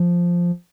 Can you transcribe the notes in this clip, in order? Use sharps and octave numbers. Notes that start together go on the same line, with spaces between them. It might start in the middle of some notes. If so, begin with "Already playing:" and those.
Already playing: F3